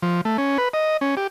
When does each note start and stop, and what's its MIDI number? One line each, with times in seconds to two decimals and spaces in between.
0.02 0.21 53
0.25 0.37 57
0.38 0.58 61
0.58 0.69 71
0.73 0.97 75
1.01 1.15 61
1.17 1.27 67